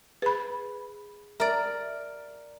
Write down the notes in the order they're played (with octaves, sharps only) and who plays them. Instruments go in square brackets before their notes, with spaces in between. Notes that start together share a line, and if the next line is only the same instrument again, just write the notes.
[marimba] G#4 [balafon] B4 B5
[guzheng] A#4 D5 [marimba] E5 A#5